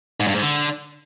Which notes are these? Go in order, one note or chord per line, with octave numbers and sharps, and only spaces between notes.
G#2
G2
G#2
D3